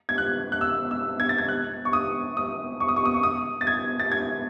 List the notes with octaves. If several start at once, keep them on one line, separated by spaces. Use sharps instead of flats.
G#6
F#6
F#6
E6
E6
G#6
A6
G#6
F#6
C#6
D#6
D#6
C#6
D#6
C#6
D#6
C#6
D#6
A6
G#6
A6
G#6